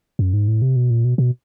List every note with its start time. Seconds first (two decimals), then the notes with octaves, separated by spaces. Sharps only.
0.19 F#2
0.33 G#2
0.48 A2
0.62 C3
0.76 B2
0.90 A#2
1.05 B2
1.18 B2